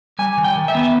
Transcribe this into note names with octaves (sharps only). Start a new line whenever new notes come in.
G3 G#5
D#3
G5
D#3
E5
B3